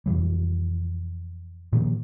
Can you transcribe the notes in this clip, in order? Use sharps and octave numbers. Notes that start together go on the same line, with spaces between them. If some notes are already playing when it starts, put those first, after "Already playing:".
F2 C3 E3 G3
A#2 D#3 F3 A#3